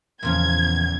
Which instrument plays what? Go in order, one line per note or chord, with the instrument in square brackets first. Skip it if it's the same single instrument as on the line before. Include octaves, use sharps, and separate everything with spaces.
[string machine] E2 [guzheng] A#2 C#3 F3 [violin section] G#6